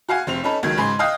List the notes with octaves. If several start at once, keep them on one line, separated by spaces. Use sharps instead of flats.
F#4 F5 F#5 G#5
F1 C4 F7
C#4 D#4 A4 B4
C#2 D#3 F#3 G#6
G#2 C#3 B4 G#5 C6
D#5 F5 G5 D#6 F#6